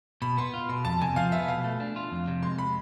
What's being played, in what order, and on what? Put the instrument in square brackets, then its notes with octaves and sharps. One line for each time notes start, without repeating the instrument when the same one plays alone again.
[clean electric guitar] B2 [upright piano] B5
[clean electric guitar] B3 [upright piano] C6
[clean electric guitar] F4
[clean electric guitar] B2 [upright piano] C6
[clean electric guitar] F2 [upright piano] A5
[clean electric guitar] C3 [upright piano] G#5
[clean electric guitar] F3 [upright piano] F5
[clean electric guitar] B3 [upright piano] E5
[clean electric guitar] B2 [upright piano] F5
[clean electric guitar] A3
D4
F4
F2
C3
[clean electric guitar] G#3 [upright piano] C6
[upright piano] B5